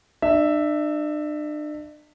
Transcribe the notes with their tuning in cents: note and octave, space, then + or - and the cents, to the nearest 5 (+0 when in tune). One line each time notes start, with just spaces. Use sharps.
D4 +40 E5 +0